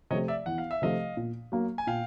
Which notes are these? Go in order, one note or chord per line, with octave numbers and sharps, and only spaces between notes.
C3 F3 A3 C#5 D#5
D5 E5
E2 F#5
F5
E5
C3 F3 A3 D#5 F5
A#2
F#3 A#3
G#5
A#2 F5 G5